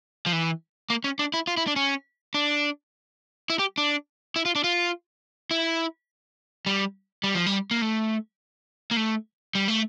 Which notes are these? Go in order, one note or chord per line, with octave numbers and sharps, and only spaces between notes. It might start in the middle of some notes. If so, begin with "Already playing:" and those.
F3
E3
A#3
C#4
D4
E4
F4
E4
D4
C#4
D4
E4
G4
D4
E4
F4
D4
F4
E4
G3
G3
F3
G3
A#3
A3
A#3
A3
G3
A3